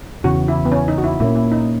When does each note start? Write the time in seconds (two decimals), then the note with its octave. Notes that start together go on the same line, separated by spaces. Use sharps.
0.24 E2 C#3 E3 F#4
0.48 E4
0.65 B3
0.72 C#4
0.88 D#4
0.98 F#4
1.04 E4
1.20 A#2 A#3 C#4 E4
1.36 E4
1.52 D#4